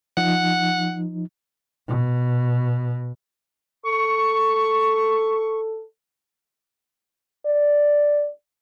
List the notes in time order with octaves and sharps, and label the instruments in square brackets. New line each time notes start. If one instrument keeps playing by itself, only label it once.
[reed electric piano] F3 D#4 [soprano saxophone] F#5
[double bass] B2
[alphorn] A4 [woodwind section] C#6
[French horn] D5